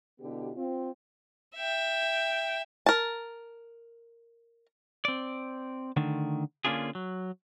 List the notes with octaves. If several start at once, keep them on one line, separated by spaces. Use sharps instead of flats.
B2 D3 B3 E4 G4
C4 F4
E5 G5
A#4 A5
C4 D5
D3 D#3 A3
D3 A#3 C#4 D4 F4 G#4
F#3